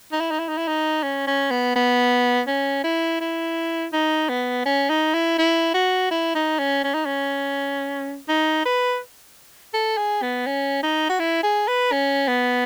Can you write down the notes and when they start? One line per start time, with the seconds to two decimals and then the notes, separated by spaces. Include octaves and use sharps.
0.12 D#4
0.21 E4
0.31 D#4
0.39 E4
0.49 D#4
0.58 E4
0.68 D#4
1.03 C#4
1.27 C#4
1.51 B3
1.76 B3
2.47 C#4
2.84 E4
3.21 E4
3.93 D#4
4.29 B3
4.66 C#4
4.90 D#4
5.14 E4
5.38 E4
5.74 F#4
6.11 E4
6.35 D#4
6.59 C#4
6.84 C#4
6.94 D#4
7.06 C#4
8.29 D#4
8.65 B4
9.73 A4
9.97 G#4
10.22 B3
10.46 C#4
10.83 D#4
11.09 F#4
11.20 E4
11.43 G#4
11.68 B4
11.92 C#4
12.27 B3